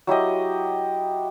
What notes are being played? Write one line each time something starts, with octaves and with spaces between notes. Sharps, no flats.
F#3 E4 G4 D#5